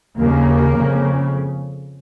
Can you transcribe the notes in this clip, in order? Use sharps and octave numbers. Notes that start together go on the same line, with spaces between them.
D#2 C#3 A#3
F2 C#3